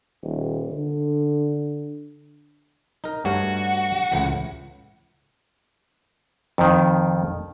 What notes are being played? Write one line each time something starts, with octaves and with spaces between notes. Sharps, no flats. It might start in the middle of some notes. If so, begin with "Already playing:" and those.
D#1
D3
D#4 A#4
G2 A3 F#4 C#5
C#2 A2 E3
F2 D#3